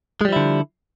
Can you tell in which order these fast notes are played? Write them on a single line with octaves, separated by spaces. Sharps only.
G#3 G3 F3 E4 D3